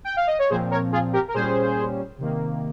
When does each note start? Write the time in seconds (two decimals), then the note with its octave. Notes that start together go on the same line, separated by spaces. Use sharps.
0.04 G5
0.16 F5
0.27 D#5
0.39 C#5
0.50 A#2 F3 C4 G#4 C5
0.71 A#4 C#5
0.92 F4 G#4
1.13 G4 A#4
1.28 A#4
1.34 A#2 G3 C#4 G#4 C5
2.18 C3 D#3 A#3